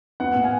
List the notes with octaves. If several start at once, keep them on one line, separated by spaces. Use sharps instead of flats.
B3 F#5
A#2
F5 G#5